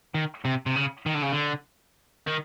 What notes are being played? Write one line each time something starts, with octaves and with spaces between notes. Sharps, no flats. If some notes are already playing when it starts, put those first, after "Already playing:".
D#3
C3
C3
C#3
D#3
D3
C#3
D3
D#3